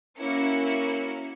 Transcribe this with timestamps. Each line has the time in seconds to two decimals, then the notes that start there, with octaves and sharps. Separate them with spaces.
0.20 A#3 C#4 E4 F#4 C#7